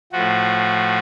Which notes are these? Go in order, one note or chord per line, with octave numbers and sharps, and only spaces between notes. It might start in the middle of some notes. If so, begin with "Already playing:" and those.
A2 F3 F#4